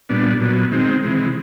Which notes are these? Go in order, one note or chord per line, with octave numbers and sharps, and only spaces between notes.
A#2 G3 B3 D4
A#2 F#3 B3
D#3 G#3 C4
C3 E3 G#3